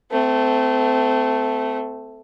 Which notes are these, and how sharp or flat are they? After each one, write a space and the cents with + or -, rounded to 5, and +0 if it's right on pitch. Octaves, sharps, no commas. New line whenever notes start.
A3 +0 C4 -30